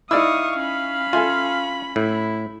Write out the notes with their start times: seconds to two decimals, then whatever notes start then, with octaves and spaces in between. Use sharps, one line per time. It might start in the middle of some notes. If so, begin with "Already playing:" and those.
0.11 D#4 E4 D5 F5 C#6 D#6 E6
0.59 C#4 B5
1.13 F4 A4 E5 G#5
1.96 A2 E4